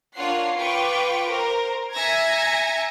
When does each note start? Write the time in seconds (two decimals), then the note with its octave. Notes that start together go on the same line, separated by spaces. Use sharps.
0.16 A#3 D4 F4 C#5 F#5 C7
0.57 F4 B4 G5 C#6 D6
1.26 A#4 C5
1.94 E5 G#5 A#5 G#6 A#6 C#7